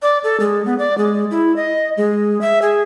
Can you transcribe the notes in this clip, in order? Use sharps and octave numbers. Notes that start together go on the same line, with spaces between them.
D5
A4
G#3
B3
D5
G#3
E4
D#5
G#3
E5
G#4